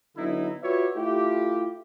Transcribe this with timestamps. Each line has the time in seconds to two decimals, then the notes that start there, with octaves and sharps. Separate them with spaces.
0.17 D3 F#3 B3 D#4 E4
0.63 F4 F#4 B4 C#5 D5 E5
0.96 A3 E4 F4 G4